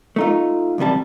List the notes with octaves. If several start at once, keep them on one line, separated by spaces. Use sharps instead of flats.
A3 D#4 F4
B1 E2 C3 G3 A5